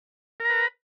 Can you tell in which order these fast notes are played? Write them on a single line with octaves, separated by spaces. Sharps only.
A#4 A#5 B4